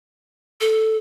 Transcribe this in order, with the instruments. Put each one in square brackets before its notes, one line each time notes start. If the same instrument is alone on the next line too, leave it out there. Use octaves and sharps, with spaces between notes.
[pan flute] A4